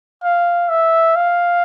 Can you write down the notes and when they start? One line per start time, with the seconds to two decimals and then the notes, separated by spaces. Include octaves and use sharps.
0.24 F5
0.69 E5
1.16 F5